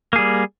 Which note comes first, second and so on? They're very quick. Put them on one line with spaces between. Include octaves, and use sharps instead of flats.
A#3 G#4 G3